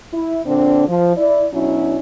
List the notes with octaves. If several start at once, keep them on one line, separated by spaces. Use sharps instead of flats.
E4
A#2 D3 C4 D4
F3
E4 D5
B2 F#3 C#4 D4 E4